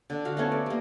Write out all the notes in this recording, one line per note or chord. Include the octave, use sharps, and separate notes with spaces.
D3
F#4 F5
A3 B3 C#4 C#5
D5
G3 A#3